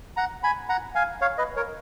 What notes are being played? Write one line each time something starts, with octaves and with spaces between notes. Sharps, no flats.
F#5 A#5
G#5 B5
F#5 A#5
F5 G#5
C#5 F5
B4 D#5
A#4 C#5